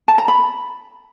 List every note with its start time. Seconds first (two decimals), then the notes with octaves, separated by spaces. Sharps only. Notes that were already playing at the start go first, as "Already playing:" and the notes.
0.08 A5
0.18 A#5
0.28 B5